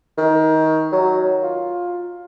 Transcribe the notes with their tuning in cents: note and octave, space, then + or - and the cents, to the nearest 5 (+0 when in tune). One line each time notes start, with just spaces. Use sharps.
D#3 +25
F#3 +5
F4 +15